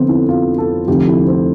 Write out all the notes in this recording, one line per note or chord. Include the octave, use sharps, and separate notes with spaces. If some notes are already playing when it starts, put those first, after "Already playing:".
Already playing: F1 F2 D3 B3 C4
E4
F4
A4
F1 F2 D3 G4
E4
C4